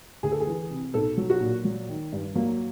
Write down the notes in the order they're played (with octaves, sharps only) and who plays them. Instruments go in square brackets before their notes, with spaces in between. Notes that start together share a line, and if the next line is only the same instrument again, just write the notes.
[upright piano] D2 G#4
A4
G#4
E3
C3
B1 A4
F#3
F#4
A#2
F#3
D#3
G2
F#3 A#3